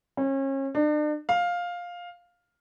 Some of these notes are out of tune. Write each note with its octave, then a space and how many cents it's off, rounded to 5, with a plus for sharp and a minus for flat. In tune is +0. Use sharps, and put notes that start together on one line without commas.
C#4 -35
D4 +40
F5 +10